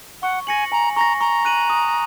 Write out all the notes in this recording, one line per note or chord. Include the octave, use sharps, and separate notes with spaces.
F#5 C#6
G#5 A#6 C#7 F#7
G#5 A#5
A#5 C#6 A#6
A#5 C#6
F#6 D#7 F#7
D#6